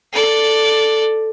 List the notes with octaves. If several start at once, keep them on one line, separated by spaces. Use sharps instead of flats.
A4 D5